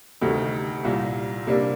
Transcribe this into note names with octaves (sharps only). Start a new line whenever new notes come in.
D2 C3 D#3 A3 D#4
C2 A#2 G3
C3 G3 A#3 D4